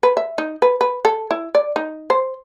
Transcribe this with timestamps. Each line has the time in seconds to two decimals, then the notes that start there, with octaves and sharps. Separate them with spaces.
0.03 B4
0.17 E5
0.38 D#4
0.62 B4
0.81 B4
1.05 A4
1.31 E4
1.55 D5
1.76 D#4
2.10 C5